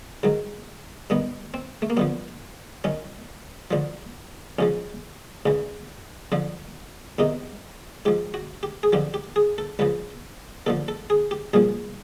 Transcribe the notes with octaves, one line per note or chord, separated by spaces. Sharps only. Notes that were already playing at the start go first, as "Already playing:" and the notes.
G#2 D#3 F#3
G2 D#3 B3
C4
A3
A#3
F#2 D3 F3 B3
F#2 D#3 C#4
D2 D3 F3
F2 C#3 F3 C#4
D2 C#3 E3
F2 D3 F3
E2 C3 D#3 D#4
G#2 F3 G4
F#4
G4
G#4
F2 D3 F3 G4
G4
G#4
A4
C#2 C#3 F3 B4
D#2 D3 F3 A4
A4
G#4
G4
C2 A#2 F3 G#4